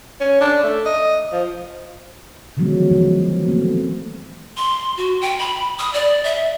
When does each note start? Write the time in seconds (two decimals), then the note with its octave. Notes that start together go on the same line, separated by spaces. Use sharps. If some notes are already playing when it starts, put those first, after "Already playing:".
0.20 C#4
0.41 D4
0.63 A3
0.85 D#5
1.32 F3
2.57 D3 D#3 F3 F#3 G#3 B3
2.91 E3 F3 G#3
3.48 A3 A#3 C4
4.57 C6
4.97 F#4
5.21 G5
5.39 B5
5.78 D#6
5.93 D5
6.24 E5